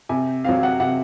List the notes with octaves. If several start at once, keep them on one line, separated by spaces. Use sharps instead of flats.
C3 G#5
F#3 C4 F5
F#5
C3 F#5